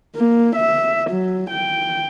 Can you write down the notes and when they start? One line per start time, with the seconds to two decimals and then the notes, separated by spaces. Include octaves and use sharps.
0.16 A#3
0.56 E5
1.10 F#3
1.50 G5